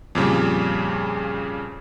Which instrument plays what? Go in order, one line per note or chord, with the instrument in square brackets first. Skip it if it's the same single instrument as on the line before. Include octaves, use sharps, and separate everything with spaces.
[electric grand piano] F2 A#2 C#3 G3